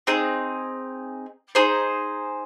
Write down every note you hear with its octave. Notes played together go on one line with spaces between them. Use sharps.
C4 D#4 G#4
D#4 G#4 C5